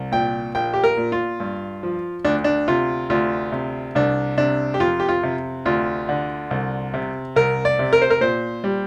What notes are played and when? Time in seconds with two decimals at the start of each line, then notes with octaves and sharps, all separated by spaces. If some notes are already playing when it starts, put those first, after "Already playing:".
Already playing: C2
0.12 A#2 G5
0.55 A#1 G5
0.74 G4
0.84 A#4
0.97 A#2
1.12 F4
1.40 G2
1.83 F3
2.25 D2 D4
2.44 D4
2.68 C3 F4
3.10 D2 F4
3.52 C3
3.95 C2 D4
4.38 C3 D4
4.74 G4
4.80 F2 F4
5.00 G4
5.09 F4
5.23 C3
5.65 D2 F4
6.09 D3
6.51 C2
6.94 C3
7.36 C2 A#4
7.65 D5
7.79 C3
7.93 A#4
8.02 C5
8.10 A#4
8.21 A#2 C5
8.64 G3